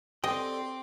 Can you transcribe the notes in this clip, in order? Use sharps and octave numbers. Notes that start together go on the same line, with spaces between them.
C4 G4 A4 D5 D#5 G5 D6